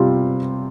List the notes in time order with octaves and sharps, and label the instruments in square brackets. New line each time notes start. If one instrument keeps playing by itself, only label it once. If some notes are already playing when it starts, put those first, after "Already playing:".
Already playing: [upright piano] C3 G3 C4 F4